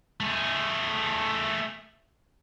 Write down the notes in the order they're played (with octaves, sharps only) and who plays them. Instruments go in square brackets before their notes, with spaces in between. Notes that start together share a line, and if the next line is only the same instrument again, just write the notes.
[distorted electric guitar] A3 G#4